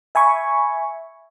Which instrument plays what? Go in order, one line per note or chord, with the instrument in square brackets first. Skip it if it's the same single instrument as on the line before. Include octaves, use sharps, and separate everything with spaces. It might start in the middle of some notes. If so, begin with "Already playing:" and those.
[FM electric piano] E5 G#5 B5 C#6